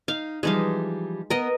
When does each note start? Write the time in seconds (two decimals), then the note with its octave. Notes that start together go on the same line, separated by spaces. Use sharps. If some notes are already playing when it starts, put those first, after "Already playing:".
0.08 D#4 F5
0.43 E3 F3 G3 G#3 D#4 F5
1.30 B3 A#4 D#5